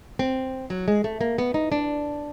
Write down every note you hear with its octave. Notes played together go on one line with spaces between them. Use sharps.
C4
F#3
G#3
A3
A#3
B3
D#4
D4